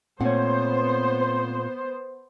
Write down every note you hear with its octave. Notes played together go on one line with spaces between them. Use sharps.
A#2 A3 B3 C4 C5 C#5 F#5